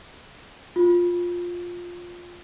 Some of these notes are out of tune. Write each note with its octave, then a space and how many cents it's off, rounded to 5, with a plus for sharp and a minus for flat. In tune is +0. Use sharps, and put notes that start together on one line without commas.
F4 +10